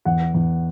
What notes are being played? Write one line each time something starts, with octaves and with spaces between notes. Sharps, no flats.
E2 F#5
E2